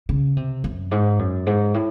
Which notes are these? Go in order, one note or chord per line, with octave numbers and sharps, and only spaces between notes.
C#3
C3
F#2
G#2
F#2
G#2
A2